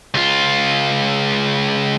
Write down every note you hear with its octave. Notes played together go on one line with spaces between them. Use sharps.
C#2 F4